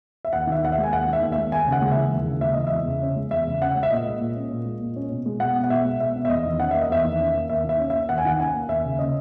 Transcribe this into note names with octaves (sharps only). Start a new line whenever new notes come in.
E5
D#2 F#5
D#3 E5
D#2 F#5
E5
G#3
G#5
D#2 F#5
D#3 E5
D#2
E5
G#3
D#2 G#5
C#3
F#5
G#3
E5
E3
D#2
C#3
G#3 E5
E3 D#5
E2 E5
C#3
C#4
G#3
E2 E5
C#3
C#4 F#5
G#3
E5
A#2 D#5
G#3
A#2
C#4
A#2
G#3
A#2
C#4
B2
G#3
B2 F#5
B3
F#5
B2 E5
G#3
B2 E5
B3
E5
E2 D#5
D#3
C#4 F#5
A#3 E5
D#5
E2 E5
D#3
C#4
A#3
D#2 E5
D#3 E5
C#4
E5
A#3
D#2 F#5
G#5
D#3 F#5
C#4 G#5
A#3
D#2 E5
C#3
C#4 D#5